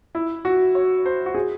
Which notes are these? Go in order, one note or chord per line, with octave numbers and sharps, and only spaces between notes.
E4
F#4
C#5
C5
F#4
G#4